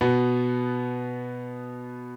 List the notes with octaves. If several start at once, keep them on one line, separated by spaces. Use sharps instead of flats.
B2 B3